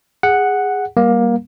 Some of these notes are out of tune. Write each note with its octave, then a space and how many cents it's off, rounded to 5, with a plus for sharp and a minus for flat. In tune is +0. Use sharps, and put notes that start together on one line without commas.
G#4 -15 F#5 +0
G3 +0 A#3 +20